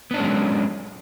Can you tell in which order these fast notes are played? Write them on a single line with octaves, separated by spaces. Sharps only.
B3 D4 C#4 G#3 F#3